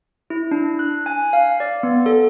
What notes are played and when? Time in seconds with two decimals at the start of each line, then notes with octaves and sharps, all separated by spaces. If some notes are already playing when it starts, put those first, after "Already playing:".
0.30 E4
0.51 D4
0.79 F#6
1.06 G#5
1.33 F5
1.60 D5
1.83 B3
2.06 A4